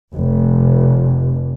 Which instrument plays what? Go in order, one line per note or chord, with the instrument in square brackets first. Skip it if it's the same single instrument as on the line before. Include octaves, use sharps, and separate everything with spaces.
[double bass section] F1